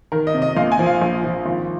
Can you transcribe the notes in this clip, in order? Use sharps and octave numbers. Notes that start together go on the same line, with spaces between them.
D#3 A#4
D#5
C3
D#5
A#1 F5
G#5
F3
F5
A#1
F3
G#1